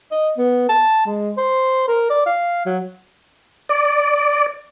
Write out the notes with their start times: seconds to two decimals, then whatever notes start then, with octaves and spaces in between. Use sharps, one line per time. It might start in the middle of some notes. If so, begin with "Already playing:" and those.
0.11 D#5
0.38 B3
0.69 A5
1.06 G#3
1.38 C5
1.88 A#4
2.10 D5
2.26 F5
2.66 F#3
3.69 D5